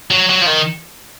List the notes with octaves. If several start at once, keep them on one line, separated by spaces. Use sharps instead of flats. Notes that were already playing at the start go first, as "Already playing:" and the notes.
F#3
F#3
F3
D#3